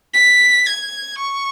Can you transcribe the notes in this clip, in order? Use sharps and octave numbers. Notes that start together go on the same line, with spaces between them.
B6
G#6
C#6